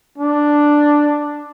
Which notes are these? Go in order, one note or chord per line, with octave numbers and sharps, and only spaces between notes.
D4